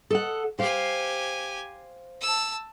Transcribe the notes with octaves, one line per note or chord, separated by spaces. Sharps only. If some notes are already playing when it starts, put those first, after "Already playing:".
A4 D#5 F#5
G4 C5 F5 G#5
A5 E6